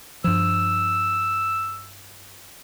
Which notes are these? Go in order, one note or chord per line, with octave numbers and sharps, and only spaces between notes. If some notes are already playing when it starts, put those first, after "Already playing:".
G2 F3 E6